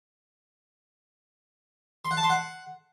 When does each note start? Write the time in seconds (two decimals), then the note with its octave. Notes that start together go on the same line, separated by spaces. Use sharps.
2.05 C6
2.11 F#5
2.17 A5
2.23 C6
2.30 F#5